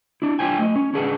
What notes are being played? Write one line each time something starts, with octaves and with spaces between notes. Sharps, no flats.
D4 E4
D4 F4 C5 G5 G#5
A3 D#5
C#4
C#4 D4 G#4 B4 E5 F#5